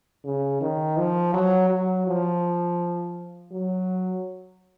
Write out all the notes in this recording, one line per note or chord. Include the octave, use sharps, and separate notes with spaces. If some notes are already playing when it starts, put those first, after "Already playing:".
C#3
D#3
F3
F#3
F#3
F3
F#3